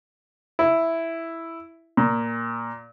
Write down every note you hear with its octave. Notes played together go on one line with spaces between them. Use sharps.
E4
A#2